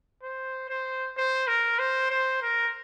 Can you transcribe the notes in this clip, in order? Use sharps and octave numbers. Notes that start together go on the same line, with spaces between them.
C5
C5
C5
A#4
C5
C5
A#4